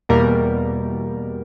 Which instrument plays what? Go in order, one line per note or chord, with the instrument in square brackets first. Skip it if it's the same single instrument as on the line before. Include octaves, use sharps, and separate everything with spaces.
[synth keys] E2 B2 G3 A#3 A#4